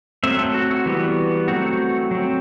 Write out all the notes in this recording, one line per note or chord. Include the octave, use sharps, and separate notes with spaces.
F#3 A3 C4 E5
A4
F#4
F#4
E3 G3 B3
F#3 A3 C4 F#4
F#3 C4